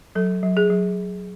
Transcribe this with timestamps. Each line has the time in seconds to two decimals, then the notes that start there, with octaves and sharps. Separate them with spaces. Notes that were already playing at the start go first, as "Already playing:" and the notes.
0.15 F#3 A4
0.43 F#3
0.57 G#4
0.70 F#3